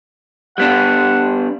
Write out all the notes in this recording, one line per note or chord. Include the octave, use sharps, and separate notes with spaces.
G3 B3 D4 F#5